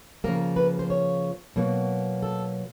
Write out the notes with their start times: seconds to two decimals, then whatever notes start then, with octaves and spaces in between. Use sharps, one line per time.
0.24 C#3 F3 A#3 A#4
0.56 B4
0.79 C5
0.90 C#5
1.56 B2 F#3 A#3
2.23 A4